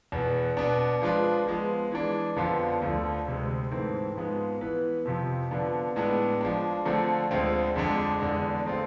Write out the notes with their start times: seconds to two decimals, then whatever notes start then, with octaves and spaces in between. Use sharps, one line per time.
0.12 E2 B2 B3
0.57 B2 B3 D4
1.02 F3 G#3 D4 F4 B4
1.46 F3 G#3 B3
1.92 E3 G#3 D4
2.36 F2 D3 F3 B3 F4
2.82 D2 D3 F3 A3
3.26 D2 C3 G#3
3.71 G#2 E3 A3 C4 E4
4.16 G#2 F3 G#3 B3
4.61 E3 B3 E4 B4
5.05 F2 C3 F3
5.51 D3 F3 B3 D4
5.96 A2 G#3 B3 D4
6.41 F3 G#3 D4
6.85 D3 F3 A3 C4
7.31 D2 D3 G#3 C4 F4
7.76 F2 D3 G#3 D4
8.20 E2 D3 G#3
8.66 D3 A3 C4 F4